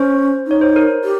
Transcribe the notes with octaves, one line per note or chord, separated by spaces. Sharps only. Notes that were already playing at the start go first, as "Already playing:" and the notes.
Already playing: C#4 C5
D#4 C#5
C5
A#4
G4